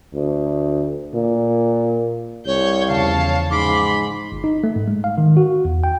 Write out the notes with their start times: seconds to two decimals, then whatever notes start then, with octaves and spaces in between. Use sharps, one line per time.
0.14 D2
1.15 A#2
2.47 C2 C#5 G6
2.88 E2 C#3 F3 C#5 F5 A5
3.51 G#2 B5 C6 D6
4.32 G1
4.44 D#4
4.64 A3
4.76 G#2
4.88 G#3
5.04 F5
5.18 D#3
5.37 F#4
5.65 E2
5.84 G5